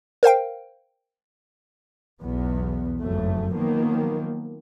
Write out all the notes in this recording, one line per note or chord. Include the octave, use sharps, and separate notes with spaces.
A#4 C5 F5 G5
B1 E2 B3
F#1 F2 G#2 F#3 A3
D#3 F3 F#3 A#3 B3